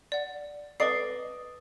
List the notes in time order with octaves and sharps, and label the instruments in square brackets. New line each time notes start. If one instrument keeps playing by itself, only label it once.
[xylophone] D5 F#5
[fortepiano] A4 D5 D#5 [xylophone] B4 C7